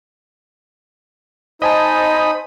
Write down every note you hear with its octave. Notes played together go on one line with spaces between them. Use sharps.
D#4 C5 D#5 G#5 A5 B5 D#6